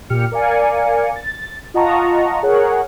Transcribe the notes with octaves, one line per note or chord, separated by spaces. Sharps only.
A#2 G4 F6 C#7
A#4 D5 F5 G#5 C#7
A6
F4 D#5 F#5 A5 A#5 C#6
G#4 A#4 C#5 F#5